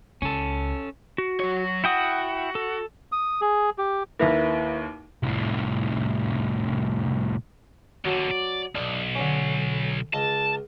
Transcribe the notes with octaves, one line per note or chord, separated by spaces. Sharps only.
C#2 C#4 A4
F#4
F#3 C#5
E4 F#4 G5 D#6
A4
D#6
G#4
G4
D#2 A#3 E4 B4 E5
C2 A2
D#2 D3 F#3
D5
B1 D4
D3 C#4
C#2 D#5 A5